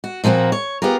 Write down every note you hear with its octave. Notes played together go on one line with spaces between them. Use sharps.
F#4
A#2 F3 A#3 C4 F#4
C#5
B3 F4 G4 G#4 A#4